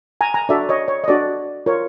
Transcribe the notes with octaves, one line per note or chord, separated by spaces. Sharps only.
G#5 A#5
G#5 A#5
D4 F#4 A4 D5 E5
C#5 D#5
C#5
D#5
D4 F#4 A4 D5
F4 A#4 C#5